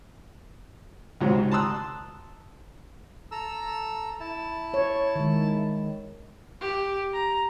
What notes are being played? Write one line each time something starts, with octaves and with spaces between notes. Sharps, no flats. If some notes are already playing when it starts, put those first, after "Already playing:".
C#2 G#2 C3 F#3
A5 A#5 C6 D#6 E6 F#6
A4 A#5 E6
E4 A5
C#5
D#3 G#3
G4
A#5